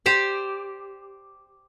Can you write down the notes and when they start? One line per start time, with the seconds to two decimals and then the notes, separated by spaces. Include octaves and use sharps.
0.06 G4 C5 D5